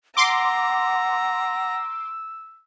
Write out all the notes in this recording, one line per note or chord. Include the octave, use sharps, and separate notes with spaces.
F#5 A#5 C6 D6 E6